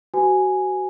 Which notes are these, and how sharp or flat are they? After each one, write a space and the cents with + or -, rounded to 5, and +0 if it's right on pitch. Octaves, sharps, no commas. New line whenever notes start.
F#4 +25 B4 +25 G#5 +0